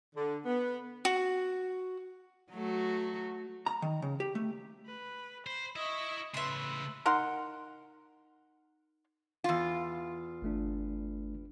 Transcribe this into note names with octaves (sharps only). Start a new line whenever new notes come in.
D3
B3
F#4
F#3 A3 F#4
A#5
D#3
C#3
G4
A3
B4
C5 B5
E4 D#5 E5 C#6
A2 C#3 B4 E5 C6
D#4 A#4 F#5 C6
E2 F4
G1 A3 D4